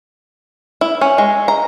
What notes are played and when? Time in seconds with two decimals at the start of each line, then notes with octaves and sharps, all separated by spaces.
0.81 E4
1.01 C#4
1.18 G#3
1.48 A#5